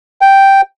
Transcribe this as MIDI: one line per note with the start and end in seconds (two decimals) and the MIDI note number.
0.21 0.61 79